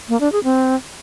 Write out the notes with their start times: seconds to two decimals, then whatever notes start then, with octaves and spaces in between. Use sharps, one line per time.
0.09 A#3
0.21 D4
0.32 G#4
0.44 C4